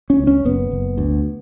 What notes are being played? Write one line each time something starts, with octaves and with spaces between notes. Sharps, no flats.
C#4
C#2
C#4
F#1 B3
F#1
D2